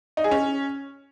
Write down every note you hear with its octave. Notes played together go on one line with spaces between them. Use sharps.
D#4
G#4
C#4